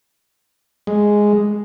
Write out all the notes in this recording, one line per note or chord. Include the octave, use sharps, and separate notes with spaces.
G#3